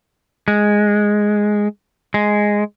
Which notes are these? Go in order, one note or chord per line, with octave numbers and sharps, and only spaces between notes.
G#3
G#3